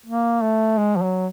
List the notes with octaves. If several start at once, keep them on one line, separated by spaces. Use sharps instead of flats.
A#3
A3
G#3
F3
F#3